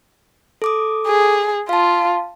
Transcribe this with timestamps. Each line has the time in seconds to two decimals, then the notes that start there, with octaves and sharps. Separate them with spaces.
0.62 A4 D6 D#6
1.07 G#4
1.69 F4 F5 A5